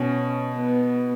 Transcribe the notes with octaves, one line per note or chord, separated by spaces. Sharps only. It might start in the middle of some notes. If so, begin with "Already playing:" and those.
Already playing: B2 C#4
B3